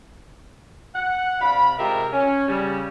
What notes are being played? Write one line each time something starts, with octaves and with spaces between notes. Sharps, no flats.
F#5
C3 D5 F5 B5
C3 G#3 F4 G4 A#4 E5
C#4
C#3 G3 C#4